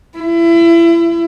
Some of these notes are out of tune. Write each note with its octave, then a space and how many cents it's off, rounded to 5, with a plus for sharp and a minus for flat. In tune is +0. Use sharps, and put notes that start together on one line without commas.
E4 +30